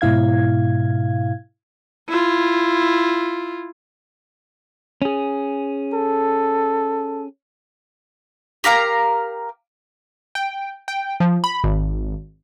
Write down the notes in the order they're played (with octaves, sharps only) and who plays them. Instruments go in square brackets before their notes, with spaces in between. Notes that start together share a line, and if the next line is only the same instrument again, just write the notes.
[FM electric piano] G#2 B2 E4 F5 G#6
[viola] E4 F4
[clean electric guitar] C#4 G#4
[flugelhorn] A4
[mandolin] G4 A#4 F5 A#5
[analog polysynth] G5
G5
F3
B5
G#1